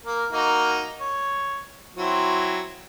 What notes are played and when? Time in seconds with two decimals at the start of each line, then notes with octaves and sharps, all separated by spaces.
0.06 A#3 A#4
0.32 A#3 D#4 F#4
1.00 C#5
1.97 F#3 C4 E4